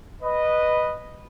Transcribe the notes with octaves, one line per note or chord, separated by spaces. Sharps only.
B4 D#5